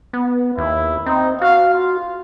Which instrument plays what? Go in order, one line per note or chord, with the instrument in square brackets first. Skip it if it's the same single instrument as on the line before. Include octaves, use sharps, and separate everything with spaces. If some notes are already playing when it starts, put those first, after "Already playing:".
[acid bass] B3
[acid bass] D#2 [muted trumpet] E4
[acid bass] C4 [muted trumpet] D#4
[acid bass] F#4 [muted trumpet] F5
[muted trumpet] F4